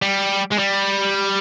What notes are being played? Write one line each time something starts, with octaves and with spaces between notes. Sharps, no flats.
G3
G#3
G3